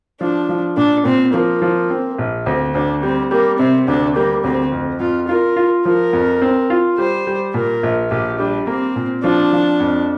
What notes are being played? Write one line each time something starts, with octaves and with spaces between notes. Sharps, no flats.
F3 D4
F3
A#2 D4
A#2 C4
F3 A#3
F3
C4
A#1
D2 C4
D2 D4
G3 C4
G3 A#3
C3 C4
D2 D4
G3 A#3
D2 C4
F2
F2 F4
F4 A#4
F4
F3 A#4
F2
C4
F4
G3 C5
G3
A#2 A#4
A#1
A#1 G4
G3 D4
A#3 C4
A#2
F3 D4
F3
F2